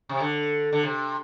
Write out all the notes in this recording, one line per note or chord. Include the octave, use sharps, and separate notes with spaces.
C3
D3
D3
C3